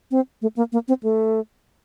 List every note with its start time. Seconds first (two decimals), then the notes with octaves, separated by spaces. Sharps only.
0.11 C4
0.42 A3
0.57 A#3
0.72 A#3
0.88 C4
1.03 A3